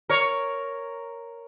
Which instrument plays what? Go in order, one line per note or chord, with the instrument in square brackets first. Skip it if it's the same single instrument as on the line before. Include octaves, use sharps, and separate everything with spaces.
[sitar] A#4 C#5